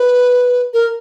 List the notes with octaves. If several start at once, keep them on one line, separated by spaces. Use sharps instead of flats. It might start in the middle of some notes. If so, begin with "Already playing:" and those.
Already playing: B4
A#4